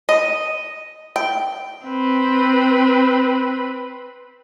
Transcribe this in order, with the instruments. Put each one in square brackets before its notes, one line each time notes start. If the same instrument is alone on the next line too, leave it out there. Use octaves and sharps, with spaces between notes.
[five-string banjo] D#5
G5
[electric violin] C4 B4